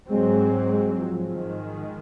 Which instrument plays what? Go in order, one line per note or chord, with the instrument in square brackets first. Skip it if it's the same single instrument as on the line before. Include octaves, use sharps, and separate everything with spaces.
[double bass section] G#2 F#3 C4 [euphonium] G#3
[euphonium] G#3
F3
[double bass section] G#2 D#3 G#3